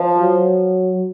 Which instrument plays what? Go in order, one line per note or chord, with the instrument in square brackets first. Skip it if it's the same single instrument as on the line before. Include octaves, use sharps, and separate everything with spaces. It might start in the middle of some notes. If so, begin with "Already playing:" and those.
Already playing: [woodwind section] F3
[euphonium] F#3